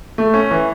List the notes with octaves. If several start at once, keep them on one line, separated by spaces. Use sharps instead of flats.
A3
C#4
E3